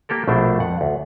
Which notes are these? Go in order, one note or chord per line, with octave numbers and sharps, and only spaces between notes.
A#3 G4 A4 A#4
A#1 B2 A3 D4 C5
F2 F#5
D2